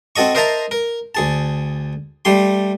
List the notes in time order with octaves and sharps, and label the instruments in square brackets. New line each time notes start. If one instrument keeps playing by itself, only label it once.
[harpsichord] C4 F#4 A4 D#5 C#6
A#4 C5 D#5 E5 A5 A#5
A#4
D2 G#4 A5
G3 A3 G4 C6